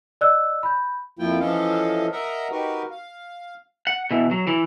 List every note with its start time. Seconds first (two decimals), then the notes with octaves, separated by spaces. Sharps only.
0.21 D5 D#5 E6 F#6
0.63 B5 G6
1.19 F2 F3 A#3 E4 F4 G5
1.40 E3 F3 C#4 A4 D#5 F5
2.12 A#4 D#5 E5 F#5 A#5
2.52 D#4 F#4 G4 A#4 B4
2.91 F5
3.87 F#5
4.11 B2 E3
4.31 F#3
4.47 E3